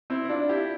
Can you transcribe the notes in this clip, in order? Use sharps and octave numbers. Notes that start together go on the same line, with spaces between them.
C4 E4
E4
D4 F4
E4 G4